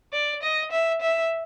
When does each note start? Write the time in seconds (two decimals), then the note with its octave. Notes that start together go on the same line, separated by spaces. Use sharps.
0.13 D5
0.42 D#5
0.71 E5
1.01 E5